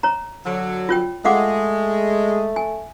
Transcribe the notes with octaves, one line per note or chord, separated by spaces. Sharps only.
C#5 A#5
D3 F#3
F4 C#5 G5
G#3 A3 F5 F#5 D6
G#5